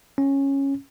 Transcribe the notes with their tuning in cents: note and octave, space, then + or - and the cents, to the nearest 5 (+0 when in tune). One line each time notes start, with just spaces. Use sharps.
C#4 -10